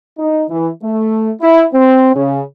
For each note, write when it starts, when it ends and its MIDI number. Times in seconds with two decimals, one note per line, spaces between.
0.19 0.43 63
0.50 0.70 52
0.83 1.30 57
1.42 1.64 64
1.73 2.14 60
2.14 2.41 49